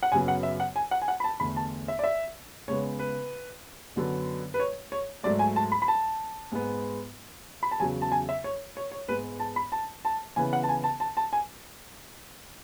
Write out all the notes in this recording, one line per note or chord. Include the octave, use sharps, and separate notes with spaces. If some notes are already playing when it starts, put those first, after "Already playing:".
F#5
F#2 C#3 F#3 B3 G#5
F#5
E5
F#5
G#5
F#5
G#5
F#5
B5
A5
E2 D3 A3 B5
A5
E5
D5
E5
C#3 G#3 B3 C#5
B4
F#2 D3 F#3 B3
B4
C#5
C#5
G#2 F#3 A3 D5
G#5
A5
B5
B5
A5
G#2 G#3 B3
B5
A5
E2 C#3 F#3 G#5
A5
G#5
E5
C#5
C#5
C#5
G#2 G#3 B3 B4
A5
B5
A5
A5
C#3 E3 B3 G#5
F#5
A5
G#5
A5
A5
A5
G#5